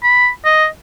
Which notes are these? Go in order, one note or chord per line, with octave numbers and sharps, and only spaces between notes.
B5
D#5